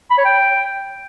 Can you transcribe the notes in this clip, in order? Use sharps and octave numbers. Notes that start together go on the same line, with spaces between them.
B5
C#5
G5